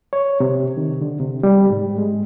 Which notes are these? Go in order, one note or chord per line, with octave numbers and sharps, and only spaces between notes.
C#5
C3
D#3
D3
C3
G3
G#2
G#3